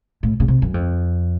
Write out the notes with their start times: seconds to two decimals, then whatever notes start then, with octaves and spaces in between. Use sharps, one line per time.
0.23 A2
0.40 C#3
0.48 C3
0.62 F#2
0.74 F2